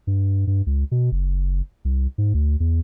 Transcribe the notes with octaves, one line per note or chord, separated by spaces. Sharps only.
G2
G2
C#2
B2
F#1
C2
G#2
D2
E2